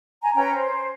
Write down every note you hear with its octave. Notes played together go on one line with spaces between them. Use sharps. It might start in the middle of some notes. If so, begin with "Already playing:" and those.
G#5 A#5
C#4 B4 G5 A#5
C5